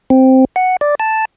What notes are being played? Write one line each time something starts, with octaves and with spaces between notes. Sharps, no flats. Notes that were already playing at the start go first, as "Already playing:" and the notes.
C4
F#5
D5
A5